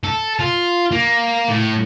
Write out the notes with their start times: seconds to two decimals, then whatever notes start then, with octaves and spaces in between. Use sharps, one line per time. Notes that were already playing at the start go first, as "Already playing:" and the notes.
0.04 A4
0.40 F4
0.92 A#3
1.49 A2